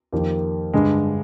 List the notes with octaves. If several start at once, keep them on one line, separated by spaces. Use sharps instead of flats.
F2 D#3 A#3 G4
G2 D3 G#3